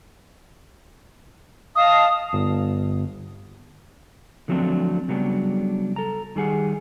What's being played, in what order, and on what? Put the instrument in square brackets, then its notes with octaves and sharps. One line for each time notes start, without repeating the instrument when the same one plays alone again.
[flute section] D#5 F5 A5 [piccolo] D#6
[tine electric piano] G1
[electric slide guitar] D3 F3 F#3 A3 C4 D4
C#3 F#3 G3 B3 D4
A4 A#5
D#3 G3 G#4 F#5